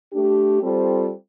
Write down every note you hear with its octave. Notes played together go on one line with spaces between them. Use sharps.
A3 D4 G4
G3 C4 F4 A4 C5